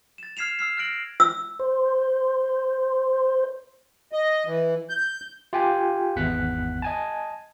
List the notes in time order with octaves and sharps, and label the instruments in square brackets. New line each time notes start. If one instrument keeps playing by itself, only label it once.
[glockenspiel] A6 E7
F6 G#6 C7 E7 F7
E6 F6 C7
F6 F#6 A#6 D7 F#7
[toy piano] E6
[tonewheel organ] C5
[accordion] D#5
E3
G6
[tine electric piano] F4 G4 G5 G#5
G#1 E2 F#5 F#6 B6
D#5 G#5 A5